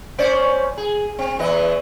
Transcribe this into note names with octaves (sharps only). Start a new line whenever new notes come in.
C#4 C5 D5
G#4
C4
E2 E3 D#5